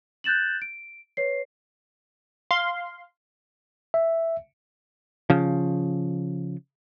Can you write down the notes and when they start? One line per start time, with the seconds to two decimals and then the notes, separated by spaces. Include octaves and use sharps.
0.24 F#6 G6 A6 E7 F#7
0.62 D7
1.17 B4 C#5 C7
2.51 F5 C6
3.94 E5
5.30 C#3 F3